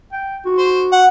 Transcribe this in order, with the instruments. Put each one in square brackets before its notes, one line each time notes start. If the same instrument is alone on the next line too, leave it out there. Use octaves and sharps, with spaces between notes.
[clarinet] G5
F#4
[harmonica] C5
F#5